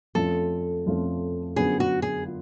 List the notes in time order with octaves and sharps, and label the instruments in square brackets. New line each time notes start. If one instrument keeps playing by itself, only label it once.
[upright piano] F2 F3 A3 C#4 F4 [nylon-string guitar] A4
[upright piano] F2 F3 A3 C#4 F4
[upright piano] F#2 D3 F#3 B3 F4 [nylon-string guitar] G#4
[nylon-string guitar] F#4
G#4
[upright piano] F4